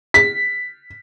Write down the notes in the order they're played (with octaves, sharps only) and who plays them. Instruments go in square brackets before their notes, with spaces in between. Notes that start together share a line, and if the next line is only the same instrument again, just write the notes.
[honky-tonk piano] B6